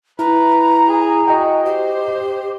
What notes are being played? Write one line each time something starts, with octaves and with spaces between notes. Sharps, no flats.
E4 B4 A#5
G#4
F#4 D#5 G5
G4 C5